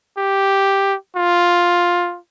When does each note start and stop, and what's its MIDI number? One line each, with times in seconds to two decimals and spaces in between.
0.18 0.95 67
1.16 2.18 65